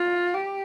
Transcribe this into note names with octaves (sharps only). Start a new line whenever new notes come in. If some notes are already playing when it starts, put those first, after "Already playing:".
Already playing: F4
G4